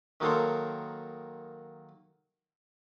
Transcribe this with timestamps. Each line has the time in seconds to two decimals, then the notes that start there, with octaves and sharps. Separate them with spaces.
0.20 D#3 F#3 A#3 A4 C5 C#5